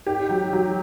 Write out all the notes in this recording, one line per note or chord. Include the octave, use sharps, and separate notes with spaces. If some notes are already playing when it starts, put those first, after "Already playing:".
G#2 G4
F#3
F#3